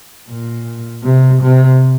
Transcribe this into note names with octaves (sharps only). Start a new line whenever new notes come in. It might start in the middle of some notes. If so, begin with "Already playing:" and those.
A#2
C3
C3